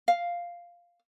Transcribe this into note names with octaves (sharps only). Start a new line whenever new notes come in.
F5